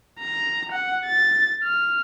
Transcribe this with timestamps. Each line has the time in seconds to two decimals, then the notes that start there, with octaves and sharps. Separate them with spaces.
0.19 A#5
0.72 F#5
1.05 A6
1.63 F6